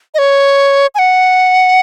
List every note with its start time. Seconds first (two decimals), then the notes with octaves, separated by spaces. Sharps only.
0.14 D#5
0.19 C#5
0.95 G#5
0.99 F#5